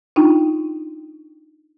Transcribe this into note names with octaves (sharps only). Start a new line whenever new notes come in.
D4 D#4 F4 G5